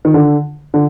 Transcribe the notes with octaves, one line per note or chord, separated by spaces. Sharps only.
D#3
D3
D3